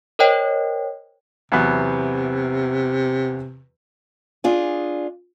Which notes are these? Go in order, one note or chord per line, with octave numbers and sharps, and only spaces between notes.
A#4 C5 C#5 D#5 G5
E2 C3 F#3 B3
D4 F4 G#4